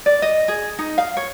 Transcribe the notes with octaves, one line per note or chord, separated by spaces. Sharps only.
D5
D#5
G#4
D#4
F5
C#5